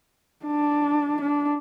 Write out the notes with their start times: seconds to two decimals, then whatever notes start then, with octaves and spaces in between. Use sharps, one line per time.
0.45 D4
1.21 D4